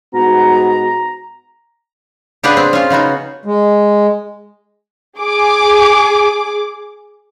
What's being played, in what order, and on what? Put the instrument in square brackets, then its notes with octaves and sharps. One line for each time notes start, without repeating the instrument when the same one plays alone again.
[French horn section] G#2 B3 F#4 [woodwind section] A#5
[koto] C#3 D4 G4 G#4 B4 F#5
C4 D4
C#4 F4
C#3 B3 D#4 F#4
[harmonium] G#3
[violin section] G#4 D6